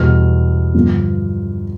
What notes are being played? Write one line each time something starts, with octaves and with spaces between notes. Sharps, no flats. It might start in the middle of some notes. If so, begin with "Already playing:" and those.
Already playing: E2 B2 G3 F6
G2 D3 F3